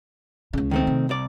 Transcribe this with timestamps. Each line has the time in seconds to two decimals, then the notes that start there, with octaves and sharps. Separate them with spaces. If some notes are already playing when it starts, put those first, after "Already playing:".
0.53 C#2 C#3
0.71 D#3 A3 C4
0.87 C3
1.09 C2 D5